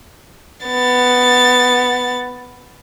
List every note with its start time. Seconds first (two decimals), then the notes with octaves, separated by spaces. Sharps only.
0.66 B3 A6